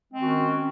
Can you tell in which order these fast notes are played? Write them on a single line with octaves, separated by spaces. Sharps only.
G#3 C4 D#3 F#4 C#4